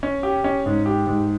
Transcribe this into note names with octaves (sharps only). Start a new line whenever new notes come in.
C#4
G4
C#4
G#2
G4
G#2